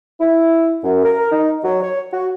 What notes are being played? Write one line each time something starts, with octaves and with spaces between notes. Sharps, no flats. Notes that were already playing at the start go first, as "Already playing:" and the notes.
E4
F#2
A#4
D#4
F#3
C#5
F#4